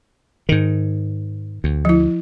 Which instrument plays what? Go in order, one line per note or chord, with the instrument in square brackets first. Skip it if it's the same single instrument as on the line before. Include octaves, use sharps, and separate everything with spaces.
[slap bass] G#2 D#3
D2
[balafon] F3 E4